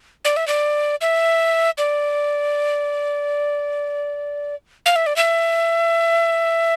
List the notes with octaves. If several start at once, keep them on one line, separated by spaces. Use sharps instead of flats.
D5
E5
D5
E5
D5
F5
E5
D5
E5